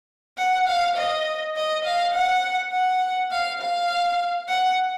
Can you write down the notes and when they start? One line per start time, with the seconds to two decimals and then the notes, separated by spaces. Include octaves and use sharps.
0.38 F#5
0.67 F5
0.97 D#5
1.56 D#5
1.85 F5
2.15 F#5
2.73 F#5
3.31 F5
3.62 F5
4.49 F#5